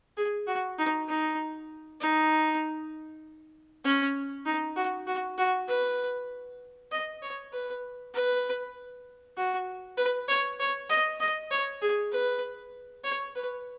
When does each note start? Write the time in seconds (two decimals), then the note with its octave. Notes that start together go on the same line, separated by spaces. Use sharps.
0.17 G#4
0.47 F#4
0.79 D#4
1.08 D#4
2.01 D#4
3.85 C#4
4.46 D#4
4.76 F#4
5.07 F#4
5.38 F#4
5.69 B4
6.92 D#5
7.22 C#5
7.53 B4
8.14 B4
9.37 F#4
9.97 B4
10.28 C#5
10.60 C#5
10.90 D#5
11.20 D#5
11.51 C#5
11.82 G#4
12.12 B4
13.04 C#5
13.36 B4